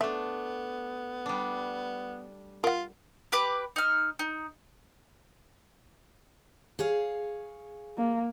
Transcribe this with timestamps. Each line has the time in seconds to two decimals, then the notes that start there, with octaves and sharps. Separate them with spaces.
0.01 A3 B3 D4 E5
1.26 G3 D4
2.64 F4 A#4 F#5
3.32 G4 B4 B5 D6
3.76 D#4 F6
4.19 D#4
6.79 G#4 C#5 F5
7.98 A#3